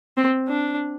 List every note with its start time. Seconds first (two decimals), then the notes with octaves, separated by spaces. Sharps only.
0.17 C4
0.48 D4